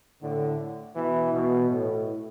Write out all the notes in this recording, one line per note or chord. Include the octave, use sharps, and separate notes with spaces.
A2 D3
B2 E3
B2
A2